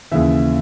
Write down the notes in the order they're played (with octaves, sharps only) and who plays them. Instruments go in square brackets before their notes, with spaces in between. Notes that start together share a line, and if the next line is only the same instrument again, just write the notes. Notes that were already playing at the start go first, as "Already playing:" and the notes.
[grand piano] D#2 C#3 E3 E5